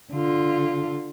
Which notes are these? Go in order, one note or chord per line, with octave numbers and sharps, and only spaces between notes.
D3 F4